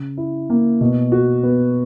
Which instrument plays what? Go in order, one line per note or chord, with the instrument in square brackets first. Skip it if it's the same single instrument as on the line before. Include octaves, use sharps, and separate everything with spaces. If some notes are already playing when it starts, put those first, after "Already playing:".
Already playing: [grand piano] C#3
E4
A#3
B2
F#4
B3